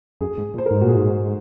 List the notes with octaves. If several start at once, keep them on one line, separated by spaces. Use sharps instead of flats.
F#2 G#4
G#2
A#2
C5
G#2 A#4
A#2 F#4
G#4
G#2